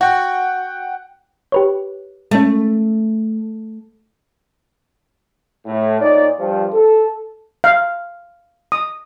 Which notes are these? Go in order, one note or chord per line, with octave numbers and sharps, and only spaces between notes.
F#4 F#5 G5
G4 B4 C#5
G#3 A3 C#4
A2
A#2 D#4 C#5 D5
G2 F3
A4
F5
D#6